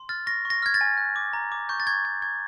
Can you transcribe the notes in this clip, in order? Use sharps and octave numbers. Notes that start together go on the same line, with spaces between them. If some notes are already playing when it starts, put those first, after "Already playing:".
Already playing: C6
F6 A6
C#6 A#6
C#6
A#6
F6 G#6
A6
G#5
F#6
D6
A#5
D6
C#6 G6
A6
C#6 G#6
C#6 G#6
C#6 G#6